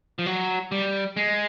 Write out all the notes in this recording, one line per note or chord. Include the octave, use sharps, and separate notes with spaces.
F3
F#3
G3
G#3